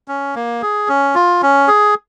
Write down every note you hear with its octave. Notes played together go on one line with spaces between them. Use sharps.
C#4
A#3
G#4
C#4
F4
C#4
G#4